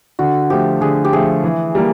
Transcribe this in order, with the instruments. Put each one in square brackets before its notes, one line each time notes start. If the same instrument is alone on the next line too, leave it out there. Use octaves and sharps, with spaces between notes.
[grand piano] D3 [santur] F#4
[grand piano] F3 A3 [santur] G4
[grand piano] D3 [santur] G#4
[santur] G4
[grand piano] F3 A3 [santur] G#4
[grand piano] E3
G3 A#3